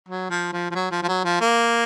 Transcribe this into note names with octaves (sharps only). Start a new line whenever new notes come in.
F#3
F3
F3
F3
F#3
F3
F3
F#3
F3
A#3